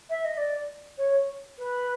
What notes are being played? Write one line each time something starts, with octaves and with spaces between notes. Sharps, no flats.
E5
D#5
D5
C#5
B4